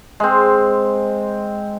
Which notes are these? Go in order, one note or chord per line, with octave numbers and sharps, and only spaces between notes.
G#3 C4